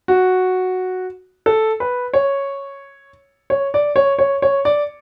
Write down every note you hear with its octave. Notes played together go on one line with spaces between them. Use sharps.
F#4
A4
B4
C#5
C#5
D5
C#5
C#5
C#5
D5